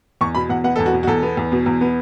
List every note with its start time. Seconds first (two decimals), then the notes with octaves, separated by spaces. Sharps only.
0.21 E2 C#6
0.35 B2 B5
0.49 E2 F#5
0.64 B3 F#5
0.76 E2 A4
0.86 F#4
0.93 B2
1.03 F#4
1.07 E2 A4
1.23 B3
1.37 E2
1.52 B2
1.66 E2
1.81 B3